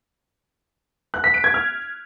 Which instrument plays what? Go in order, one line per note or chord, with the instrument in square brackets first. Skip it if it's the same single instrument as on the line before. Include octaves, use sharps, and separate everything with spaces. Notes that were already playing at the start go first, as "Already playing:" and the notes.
[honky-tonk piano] F#6
B6
D7
G#6
F6